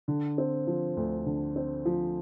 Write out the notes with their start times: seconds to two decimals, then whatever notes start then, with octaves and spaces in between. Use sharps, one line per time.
0.08 D3
0.38 C4
0.67 F3
0.97 D2
1.26 D3
1.56 C4
1.85 F3